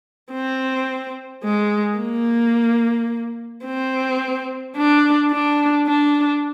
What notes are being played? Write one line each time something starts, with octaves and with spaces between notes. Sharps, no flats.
C4
G#3
A#3
C4
D4
D4
D4